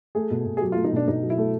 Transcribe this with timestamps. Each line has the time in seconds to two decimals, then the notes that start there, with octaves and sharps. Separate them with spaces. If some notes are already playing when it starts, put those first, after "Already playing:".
0.15 A3 G#4
0.31 B2
0.46 B2
0.57 G#4
0.61 F#3 G4
0.72 A3 F4
0.85 D#4
0.92 B2 D4
1.07 B2 D#4
1.23 F#3
1.30 E4
1.38 A3